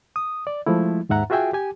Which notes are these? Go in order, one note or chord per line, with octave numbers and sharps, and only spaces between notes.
D#6
D5
F3 G#3 A3 E4
D#2 G#2 E5 F#5 A#5
F4 F#4 G#4 E5 G5 G#5
G4 G#5